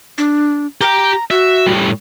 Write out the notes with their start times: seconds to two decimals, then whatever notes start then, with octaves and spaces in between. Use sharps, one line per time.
0.18 D4
0.81 G4 G5 A#5
1.31 F#4 E5
1.67 A2 G3